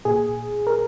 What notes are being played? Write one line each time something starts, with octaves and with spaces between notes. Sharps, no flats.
A#2 G#4
A#4